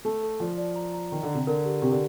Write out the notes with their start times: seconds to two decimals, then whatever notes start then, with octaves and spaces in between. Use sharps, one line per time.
0.05 A3 A5
0.23 A4
0.40 F3 D5
0.58 D5
0.76 A#5
0.94 A#5
1.12 D#3 A#5
1.23 D3
1.28 A#5
1.35 C3
1.47 D3 A#4
1.65 G4
1.82 C3 G4
1.91 D3